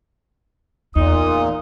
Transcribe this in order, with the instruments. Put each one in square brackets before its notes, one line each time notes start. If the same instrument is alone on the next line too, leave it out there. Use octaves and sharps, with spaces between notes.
[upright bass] E2 [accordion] A#2 [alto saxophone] D#4 [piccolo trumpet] D#6